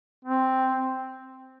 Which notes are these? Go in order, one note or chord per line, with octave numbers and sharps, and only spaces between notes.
C4